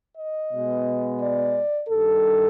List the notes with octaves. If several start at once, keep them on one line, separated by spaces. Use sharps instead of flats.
D#5
B2 G#3 B3
D5
G2 D#3 G3 A4